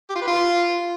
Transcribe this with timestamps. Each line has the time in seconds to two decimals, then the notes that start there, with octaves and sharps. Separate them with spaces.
0.09 G4
0.15 F4
0.21 B4
0.27 F4